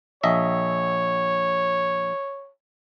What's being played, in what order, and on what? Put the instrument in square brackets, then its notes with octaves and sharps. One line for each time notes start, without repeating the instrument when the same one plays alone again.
[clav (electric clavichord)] A#1 D#5 E5 [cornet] C#5